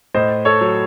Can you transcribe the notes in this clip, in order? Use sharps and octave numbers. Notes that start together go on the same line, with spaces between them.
A2 C5 D#5
A4 C#5
F#3